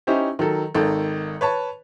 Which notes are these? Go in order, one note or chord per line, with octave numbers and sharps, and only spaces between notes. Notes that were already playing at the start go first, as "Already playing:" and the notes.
C#4 D#4 E4 G4 C5
D#3 F#3 A4
G#1 D#3 A4
B4 C#5 A5